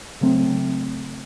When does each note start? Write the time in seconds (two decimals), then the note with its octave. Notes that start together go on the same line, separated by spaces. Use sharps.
0.21 C#3 F#3 A3 C4